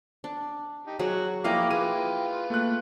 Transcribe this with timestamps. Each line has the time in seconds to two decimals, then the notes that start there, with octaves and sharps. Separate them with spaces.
0.24 D4
0.87 D#4 G4
0.99 F#3 F#4 G#4
1.44 F3 A#3 E4 D#5 F5 G5 A#5 D6
1.71 F4 G#4 B4 D#7
2.50 A3 A#3 F#6